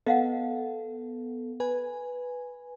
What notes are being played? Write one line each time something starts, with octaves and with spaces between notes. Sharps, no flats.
B3 A4 D#5 F5 F#5
B4 G#5